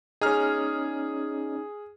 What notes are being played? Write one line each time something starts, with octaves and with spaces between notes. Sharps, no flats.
C#4 D#4 G#4 F6